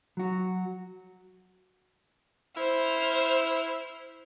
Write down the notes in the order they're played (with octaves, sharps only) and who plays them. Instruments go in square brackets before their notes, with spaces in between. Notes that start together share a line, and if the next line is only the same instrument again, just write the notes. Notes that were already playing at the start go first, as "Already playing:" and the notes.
[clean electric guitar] F#3 F#4
[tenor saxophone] E4 [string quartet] C5 F6